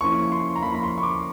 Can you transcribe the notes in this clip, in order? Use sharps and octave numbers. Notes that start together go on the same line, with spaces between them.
F3 A#3 C#4 E4 C#6
C6
A#5
F3 A#3 C#4 E4 B5
B5
C6
C#6
D6